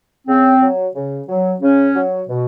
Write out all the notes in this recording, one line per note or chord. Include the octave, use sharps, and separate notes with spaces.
C#3 C4
F#3
C#3
F#3
C#3 C#4
F#3
B2